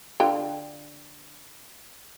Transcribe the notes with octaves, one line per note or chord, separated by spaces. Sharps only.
D3 F4 G5